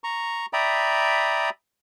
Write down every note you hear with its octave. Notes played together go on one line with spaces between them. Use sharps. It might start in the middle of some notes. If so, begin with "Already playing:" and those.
A#5 C#6
D5 E5 G5 A#5 B5 D#6